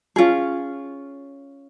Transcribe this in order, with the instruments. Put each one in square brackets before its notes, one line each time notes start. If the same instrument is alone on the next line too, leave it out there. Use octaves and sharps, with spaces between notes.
[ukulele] C#4 F4 G#4